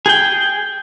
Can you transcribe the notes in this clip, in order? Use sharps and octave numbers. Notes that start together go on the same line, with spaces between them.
G#4 G5